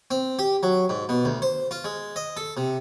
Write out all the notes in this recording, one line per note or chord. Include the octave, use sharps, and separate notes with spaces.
C4
G4
F#3
G#2
B2
D2
C5
F4
G#3
D#5
A4
C3